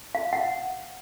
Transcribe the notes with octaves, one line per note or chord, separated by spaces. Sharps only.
F5
F#5